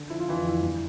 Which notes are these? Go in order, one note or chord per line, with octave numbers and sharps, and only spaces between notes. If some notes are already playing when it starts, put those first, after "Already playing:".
Already playing: D3
F3 E4
F4
F2 E3 E4
F2
G2